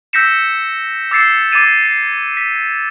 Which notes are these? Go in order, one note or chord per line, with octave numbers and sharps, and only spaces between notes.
E6 G6 A#6 B6 C#7 E7
D6 E6 A6 C7 C#7 E7
D6 G#6 A6 D#7 E7
C7
B6